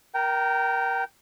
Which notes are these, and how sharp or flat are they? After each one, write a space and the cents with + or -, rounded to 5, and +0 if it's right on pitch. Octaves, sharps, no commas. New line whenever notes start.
A#4 +15 G5 -20 A#5 -25